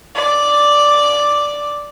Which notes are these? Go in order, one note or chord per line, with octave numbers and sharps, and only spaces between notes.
D5 D6